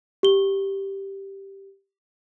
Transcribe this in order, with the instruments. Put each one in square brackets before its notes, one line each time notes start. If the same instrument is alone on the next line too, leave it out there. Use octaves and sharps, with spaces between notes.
[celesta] G4 G7